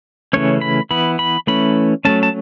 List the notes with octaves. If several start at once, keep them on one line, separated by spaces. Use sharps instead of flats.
C#3 E3 A3 C#4 C#5
B5
E3 B3 B5
B5
E3 A3 C#4 B5
F#3 A3 C#4 A5
A5